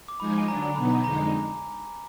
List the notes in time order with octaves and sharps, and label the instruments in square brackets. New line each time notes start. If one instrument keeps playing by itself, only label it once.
[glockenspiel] D6
[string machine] F3 G#3 D#4 G#4 [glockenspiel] B5
[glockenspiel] G#5
[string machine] D3 F#3 D4 [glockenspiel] A#5
[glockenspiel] A#5
[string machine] B2 F#3 B3 D#4 [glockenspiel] B5
[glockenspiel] A#5
[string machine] F2 D3 G#3 D#4 [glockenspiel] A#5